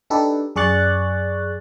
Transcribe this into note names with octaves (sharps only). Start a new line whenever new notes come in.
D4 D#4 G4 A4 B4
F#2 G#4 D5 C#6 F#6 A6